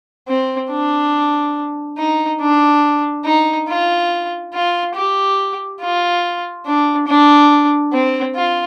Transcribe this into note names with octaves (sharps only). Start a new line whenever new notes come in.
C4
D4
D#4
D4
D#4
F4
F4
G4
F4
D4
D4
C4
F4